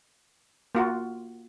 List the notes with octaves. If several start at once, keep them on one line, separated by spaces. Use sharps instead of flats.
A#3 F4 F#4